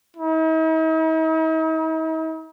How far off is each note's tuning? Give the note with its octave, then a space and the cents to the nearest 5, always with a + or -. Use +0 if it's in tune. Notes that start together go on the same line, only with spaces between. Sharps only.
D#4 +45